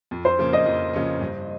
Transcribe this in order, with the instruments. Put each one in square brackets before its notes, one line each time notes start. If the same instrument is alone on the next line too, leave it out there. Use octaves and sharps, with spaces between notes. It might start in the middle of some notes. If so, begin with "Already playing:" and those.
[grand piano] F2
[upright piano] C5
[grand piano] C#3 F3 A#3 C#4
[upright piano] D#5
[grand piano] F2
C#3 F3 A#3 C#4
G2